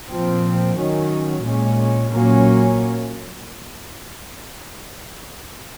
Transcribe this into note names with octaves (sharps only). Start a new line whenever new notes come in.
A#2 F3 C4
D#3 F#3 C#4
A#2 G#3 C#4
A#2 F#3 A#3 C#4